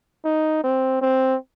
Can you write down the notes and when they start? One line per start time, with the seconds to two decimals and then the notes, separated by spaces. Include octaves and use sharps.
0.25 D#4
0.64 C4
1.02 C4